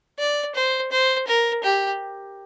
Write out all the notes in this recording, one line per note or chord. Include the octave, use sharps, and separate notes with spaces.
D5
C5
C5
A#4
G4